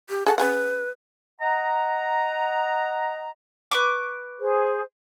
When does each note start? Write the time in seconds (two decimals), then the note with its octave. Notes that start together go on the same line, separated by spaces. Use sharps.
0.09 G4
0.26 G#4 A4 F#5 A5
0.38 C#4 G#4 B4 F#5
1.41 D#5 F#5 A#5
3.71 B4 C#6 D6
4.40 G#4 C5